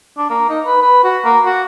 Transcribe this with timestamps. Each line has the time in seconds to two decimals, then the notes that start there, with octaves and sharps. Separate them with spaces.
0.18 D4
0.30 A#3
0.49 D#4
0.66 B4
0.82 B4
1.04 F#4
1.25 A#3
1.45 F#4